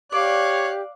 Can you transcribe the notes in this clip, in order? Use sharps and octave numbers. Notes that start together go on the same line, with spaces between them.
G4 C#5 D5 F5 F#6